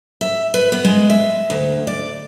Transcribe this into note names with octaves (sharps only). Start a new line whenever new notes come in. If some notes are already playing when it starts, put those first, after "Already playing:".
E5
B4
B3
G#3
E5
D2
D5